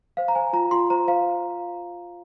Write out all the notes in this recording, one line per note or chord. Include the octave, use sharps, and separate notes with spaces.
C5 F5
A#5
C5 G#5
F4 A#5
F4 C6
C5 A#5
C5 F5